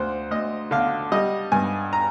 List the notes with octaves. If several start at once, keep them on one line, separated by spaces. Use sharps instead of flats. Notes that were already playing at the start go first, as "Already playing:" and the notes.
Already playing: D2 C5
D2 D#5
D3 F5
G3 D#5
G2 G#5
A#5